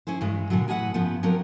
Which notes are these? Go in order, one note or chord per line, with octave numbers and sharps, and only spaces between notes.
C#4 E4 G#4 C5
G2 E3 G#3
A#2 D3 F#3
A2 G#4 B4 F5 F#5
G2 C#3 F3 B3
F3 F#3 C4 D4 A#4